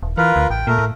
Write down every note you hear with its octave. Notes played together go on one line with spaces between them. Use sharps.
D#1
E3 F4 A#4 B4
D2
A1 G5
A#2 A3 A#4
A2